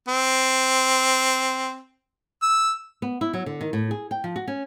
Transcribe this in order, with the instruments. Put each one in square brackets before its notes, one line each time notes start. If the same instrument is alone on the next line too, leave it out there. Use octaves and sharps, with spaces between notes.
[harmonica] C4
E6
[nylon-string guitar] B3
E4
F#3
D3
D#3
A2
G#4
G5
F3
F#4
C#4